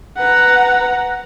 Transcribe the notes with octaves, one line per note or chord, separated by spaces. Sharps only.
B4 F#5 A#5